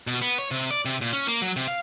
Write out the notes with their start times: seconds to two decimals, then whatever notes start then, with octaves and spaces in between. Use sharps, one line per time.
0.07 B2
0.22 B3
0.39 C#5
0.51 C3
0.71 D5
0.85 C3
1.01 A#2
1.13 C#4
1.27 A#3
1.42 F#3
1.56 C3
1.68 F5